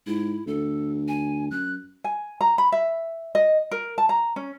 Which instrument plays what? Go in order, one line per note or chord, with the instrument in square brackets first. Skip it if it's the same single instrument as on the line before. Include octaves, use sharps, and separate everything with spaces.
[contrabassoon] G#2 [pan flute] E4
[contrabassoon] D2 [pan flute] A4
[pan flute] G#5
[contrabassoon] F#2 [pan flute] F#6
[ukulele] G#5
A#5
B5
E5
D#5
A#4
A5
A#5
C#4